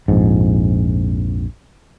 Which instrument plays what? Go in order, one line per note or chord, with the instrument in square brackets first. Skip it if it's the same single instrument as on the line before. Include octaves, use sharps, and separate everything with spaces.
[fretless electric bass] A#1 F2 G#2